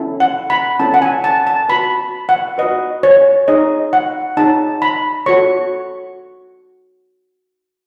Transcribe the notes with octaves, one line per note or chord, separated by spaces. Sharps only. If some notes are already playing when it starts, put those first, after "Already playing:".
Already playing: C#4 E4 A4
F#5
B5
C#4 E4 A4 A5
F#5
G#5
A5
A5
F#4 B4 B5
F#5
F#4 B4 D#5
C#5
D#4 G#4 C#5 D#5
F#5
D#4 G#4 C#5 A5
B5
F#4 A4 C#5 C#6